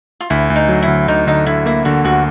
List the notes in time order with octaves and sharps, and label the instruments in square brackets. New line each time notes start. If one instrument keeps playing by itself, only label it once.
[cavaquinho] F4
[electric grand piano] D2 [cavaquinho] E4
[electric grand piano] D2
[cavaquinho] D#4
[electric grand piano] F#3
[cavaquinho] E4
[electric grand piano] D2
[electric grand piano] D2 [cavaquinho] D#4
[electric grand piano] D3 [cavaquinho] D#4
[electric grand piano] D3 [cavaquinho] E4
[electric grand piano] A#3 [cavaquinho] E4
[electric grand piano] D3 [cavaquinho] F#4
[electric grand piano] D2 [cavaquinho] F#4